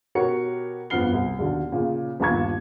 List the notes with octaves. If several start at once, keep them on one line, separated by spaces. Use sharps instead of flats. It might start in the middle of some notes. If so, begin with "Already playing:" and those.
B2 F#4 G4 A#4 C#5 C#7
G1 F2 B3 F6 C7 G7
C2
D#2 B2 D3
A#2 C#3
G1 D#2 A#2 A5 C#6 G#6